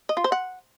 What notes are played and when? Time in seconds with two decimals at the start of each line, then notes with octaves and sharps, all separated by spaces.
0.09 D#5
0.17 F4
0.24 C5
0.32 F#5